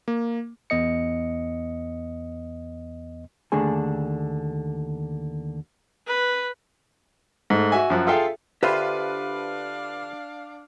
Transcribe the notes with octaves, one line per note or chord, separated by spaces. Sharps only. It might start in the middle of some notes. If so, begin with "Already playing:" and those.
A#3
E2 B3 D#5 C#7
D#2 D3 A3 D4 G#4 G#5
B4
G#2 A3
F#4 E5 G#5
F#2 F3 F#6
F4 G#4 A4 E5 F5 G5
D3 D4 F4 G4 B4 C5 E5 F5